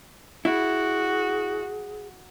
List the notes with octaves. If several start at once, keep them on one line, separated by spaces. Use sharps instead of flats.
E4 F#4 G#4